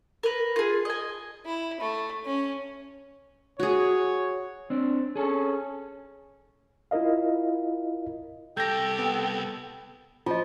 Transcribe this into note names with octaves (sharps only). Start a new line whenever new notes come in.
A#4 B4
F4 G#4
D#5 G#5
E4
A3
C#4
F#4 G#4 C#5
C4 D4
C#4 G#4 A4
E4 F4 A#4 D#5 F5
C2 G4 A4 G5 G6 A#6
B3
F3 F4 D#5